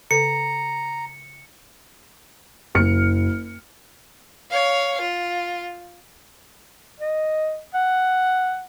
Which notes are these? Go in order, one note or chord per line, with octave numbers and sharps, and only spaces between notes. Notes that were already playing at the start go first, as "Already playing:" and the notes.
C#3 A4 A#5 C#7
F#1 F6 C#7
C#5 F5
F4
D#5
F#5